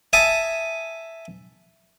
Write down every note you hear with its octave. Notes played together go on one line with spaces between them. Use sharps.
E5 G#5 A5 D#6